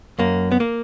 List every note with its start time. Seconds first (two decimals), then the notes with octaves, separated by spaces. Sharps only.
0.19 F#2 A#3
0.52 B3
0.60 A#3